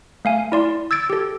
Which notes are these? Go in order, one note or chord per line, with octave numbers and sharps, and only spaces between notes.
A3 F5 G#5
E4 D5 C6
E6 G#6 A6 D7
G4 A4